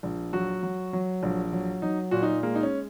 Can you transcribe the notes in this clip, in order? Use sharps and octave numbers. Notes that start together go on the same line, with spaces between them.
A#1
F#3 F#4
F#3
F#3
A#1
F#3
F#3 D#4
A#2 F#4
D#4
G#3 A#3
D#4
C#4